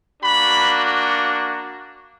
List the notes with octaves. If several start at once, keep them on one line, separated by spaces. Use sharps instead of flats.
A#3 D4 F#4 B5